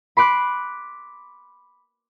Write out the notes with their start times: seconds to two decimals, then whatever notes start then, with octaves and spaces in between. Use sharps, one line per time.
0.17 B5 C6 D6 F#6